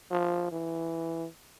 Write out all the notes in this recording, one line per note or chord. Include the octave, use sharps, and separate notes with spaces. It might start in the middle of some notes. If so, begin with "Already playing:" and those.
F3
E3